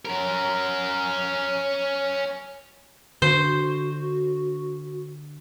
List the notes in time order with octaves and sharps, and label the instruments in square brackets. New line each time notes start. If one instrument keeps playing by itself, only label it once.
[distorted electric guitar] C#4 A#4
[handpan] D3 [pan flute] F#4 [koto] C5